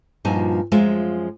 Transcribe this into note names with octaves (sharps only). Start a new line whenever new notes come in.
G2 A#2 F3 D#4 F#4 G#5
F#2 F3 G#3 F4 E5 G#5